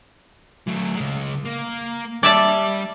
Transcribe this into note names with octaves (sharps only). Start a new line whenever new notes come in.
F#3 A3
C#3 G#3
A#3
G3 D5 E5 A5